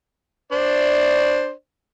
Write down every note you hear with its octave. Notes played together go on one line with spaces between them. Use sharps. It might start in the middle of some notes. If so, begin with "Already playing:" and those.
D4 C5 D5